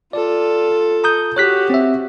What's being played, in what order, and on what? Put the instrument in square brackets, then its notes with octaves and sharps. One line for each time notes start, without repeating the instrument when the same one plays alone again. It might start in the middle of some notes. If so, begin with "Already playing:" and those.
[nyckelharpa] F4 A4 [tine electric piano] D5
[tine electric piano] A#5 D#6 G6
[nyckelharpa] F#4 G4 [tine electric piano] C#5 F#6 B6
[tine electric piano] C4 E5